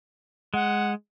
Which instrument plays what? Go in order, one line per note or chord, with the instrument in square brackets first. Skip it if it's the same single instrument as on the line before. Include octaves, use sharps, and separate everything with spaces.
[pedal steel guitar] G#3 [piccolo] F#5